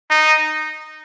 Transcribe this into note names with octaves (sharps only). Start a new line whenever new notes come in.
D#4